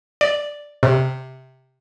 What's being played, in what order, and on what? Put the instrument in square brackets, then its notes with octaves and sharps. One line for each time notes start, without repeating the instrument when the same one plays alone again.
[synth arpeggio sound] D5
C3